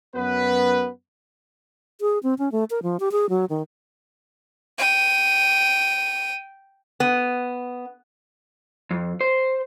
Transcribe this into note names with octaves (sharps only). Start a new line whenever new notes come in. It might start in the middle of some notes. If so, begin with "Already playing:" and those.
F#2 B3 B4
G#4
C4
C#4
A3
A#4
F3
G4
G#4
F#3
D#3
G5 D#7
B3
F2
C5